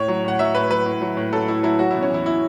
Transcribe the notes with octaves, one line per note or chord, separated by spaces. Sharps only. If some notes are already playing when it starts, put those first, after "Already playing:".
Already playing: A2 C#5
F#3
A2 F#5
F#3 E5
A2 B4
F#3 B4
A2
F#3
A2
F#3 A4
A2 E4
F#3 E4
F#3 F#4
B2 E4
C#4
E2 E4
E4